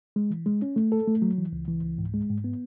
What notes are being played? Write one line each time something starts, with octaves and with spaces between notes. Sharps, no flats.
G#3
E3
G#3
C#4
A3
A4
A3
F#3
E3
C#2
E3
C#2
G#2
G#3
G#2
B3